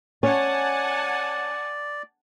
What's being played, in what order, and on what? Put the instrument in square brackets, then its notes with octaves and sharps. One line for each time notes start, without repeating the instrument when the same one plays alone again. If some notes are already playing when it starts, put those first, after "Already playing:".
[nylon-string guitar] C#4 [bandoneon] D5 [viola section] F#5 G#5 A5